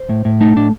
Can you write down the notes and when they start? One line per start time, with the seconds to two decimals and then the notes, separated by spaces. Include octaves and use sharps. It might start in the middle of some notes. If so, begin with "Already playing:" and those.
Already playing: C5
0.09 A2
0.25 A2
0.41 A3 D#4
0.56 A2 D4